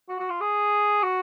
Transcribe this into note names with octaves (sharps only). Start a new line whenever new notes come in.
F#4
F#4
F4
G#4
F#4